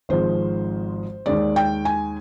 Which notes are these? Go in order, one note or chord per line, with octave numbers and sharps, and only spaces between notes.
G#1 G#2 F3 G#3 C5
D#2 D#3 G#3 D5
G5
G#5